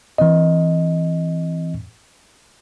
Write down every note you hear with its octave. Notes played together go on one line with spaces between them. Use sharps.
E3 C4 D#5